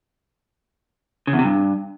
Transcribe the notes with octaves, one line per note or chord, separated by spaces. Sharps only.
C#3
E2
C3
G2